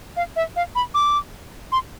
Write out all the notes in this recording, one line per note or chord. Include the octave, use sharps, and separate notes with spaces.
F5
E5
F5
B5
D6
C6